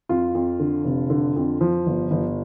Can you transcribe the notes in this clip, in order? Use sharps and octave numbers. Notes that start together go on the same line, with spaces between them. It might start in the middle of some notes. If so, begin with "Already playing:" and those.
F2 F4
F2
D3
F1
D3
F2
F3
G1
G1